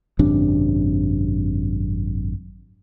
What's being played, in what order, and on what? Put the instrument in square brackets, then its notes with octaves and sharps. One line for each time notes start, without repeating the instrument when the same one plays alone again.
[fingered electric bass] G#1 F#2 C3 D4